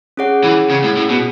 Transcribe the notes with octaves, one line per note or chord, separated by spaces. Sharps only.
C#4 G#4 C#5 F#5
E3
C#3
A2
A2
B2